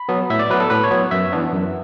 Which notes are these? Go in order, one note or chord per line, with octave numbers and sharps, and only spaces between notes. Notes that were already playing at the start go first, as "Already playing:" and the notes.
Already playing: B5
F#3 B3
A2 E5
D5
F#3 B3 B4
A4
A2 B4
C#5
F#3 B3
F#2 E5
E3 B3 D4
F#2